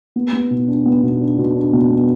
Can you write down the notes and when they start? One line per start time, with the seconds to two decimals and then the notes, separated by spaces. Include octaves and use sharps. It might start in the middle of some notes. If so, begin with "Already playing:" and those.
0.16 B3
0.33 B3
0.51 B2
0.68 D4
0.85 B3
1.03 B2
1.21 D4
1.38 B2
1.56 D4
1.73 B2
1.91 B3